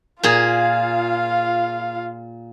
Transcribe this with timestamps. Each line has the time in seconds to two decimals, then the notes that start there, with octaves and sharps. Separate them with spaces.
0.23 A#2 F4 G#4 F5